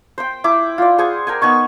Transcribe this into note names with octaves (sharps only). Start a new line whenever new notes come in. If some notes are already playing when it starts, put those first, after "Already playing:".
C5 G5
E4 D6
F4 D5
G#4 C5 F#5 G#5
A#4 G5 G#5
B3 D#4 G#5 C#6